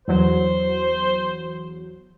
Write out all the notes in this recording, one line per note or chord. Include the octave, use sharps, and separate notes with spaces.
E2 F#3 C5